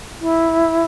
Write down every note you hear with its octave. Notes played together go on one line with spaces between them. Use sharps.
E4